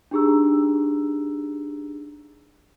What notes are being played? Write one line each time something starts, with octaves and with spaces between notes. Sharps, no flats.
D4 D#4 G4 G#4 A#5 E6